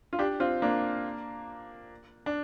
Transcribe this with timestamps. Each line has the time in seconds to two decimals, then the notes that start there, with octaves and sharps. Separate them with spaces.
0.13 F4
0.19 D4 G4
0.40 C4 F4
0.62 A#3 D4
2.26 D4